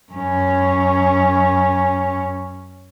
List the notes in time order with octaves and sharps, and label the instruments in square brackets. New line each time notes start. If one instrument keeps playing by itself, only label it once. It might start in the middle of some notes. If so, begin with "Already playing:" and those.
[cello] F#2 C#4